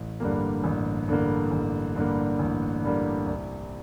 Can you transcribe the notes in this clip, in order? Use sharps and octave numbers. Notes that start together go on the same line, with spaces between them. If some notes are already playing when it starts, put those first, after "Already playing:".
Already playing: A1
G2 D3 G3 A#3
A1
G2 D3 G3 A#3
A1
G2 D3 G3 A#3
A1
G2 D3 G3 A#3
C2